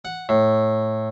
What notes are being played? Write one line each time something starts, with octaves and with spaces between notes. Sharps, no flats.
F#5
A2